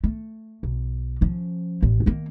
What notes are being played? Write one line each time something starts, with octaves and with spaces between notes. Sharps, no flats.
A3
B1
F3 C#4
A1 A2
D#3 A#3